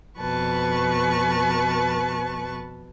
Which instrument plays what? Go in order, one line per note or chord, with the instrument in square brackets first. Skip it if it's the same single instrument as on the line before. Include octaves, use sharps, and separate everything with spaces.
[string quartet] F2 B2 B4 A5 C#6